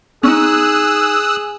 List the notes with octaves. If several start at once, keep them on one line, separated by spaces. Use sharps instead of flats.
C#4 D#4 G#4 D#6 E6 F#6